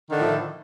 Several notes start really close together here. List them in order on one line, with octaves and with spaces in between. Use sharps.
D#3 D3 A2 A3 F3